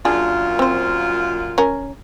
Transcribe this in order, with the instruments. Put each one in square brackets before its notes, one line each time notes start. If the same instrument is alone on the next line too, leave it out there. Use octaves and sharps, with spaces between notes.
[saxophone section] F#2 A#2 F4 [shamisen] D4 G#4
[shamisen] C4 C5
C#4 A#4